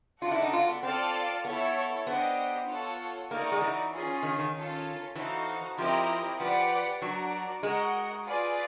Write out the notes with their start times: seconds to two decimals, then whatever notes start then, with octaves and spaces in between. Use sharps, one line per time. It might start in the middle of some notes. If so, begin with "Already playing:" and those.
0.21 F4 F#4 A4 D5 F#5 A5
0.31 E4
0.42 D#4
0.53 F4
0.68 B3
0.83 C4 F4 A4 D5 F5 A5
1.45 B3 E4 A4 C#5
2.07 B3 D4 G4 C5 D#5
2.68 F4 A4 C#5 F#5
3.30 A#3 D#4 F#4 A#4 D5
3.40 A3
3.52 G#3
3.61 E3
3.92 C#4 F4 G#4
4.23 D#3
4.39 D#3
4.55 C#4 F4 A4
5.15 E3 D#4 F#4 A4 C5 F5
5.78 F3 C4 E4 G4 A#4 D#5
6.39 F3 G4 B4 D5 F#5
7.01 F#3 D4 F#4 A#4 D5
7.62 G#3 F#4 A#4 D#5 F#5
8.25 F4 G#4 B4 D5